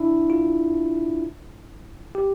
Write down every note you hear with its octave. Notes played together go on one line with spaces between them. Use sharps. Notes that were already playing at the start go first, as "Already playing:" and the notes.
Already playing: D4 E4
F4
G4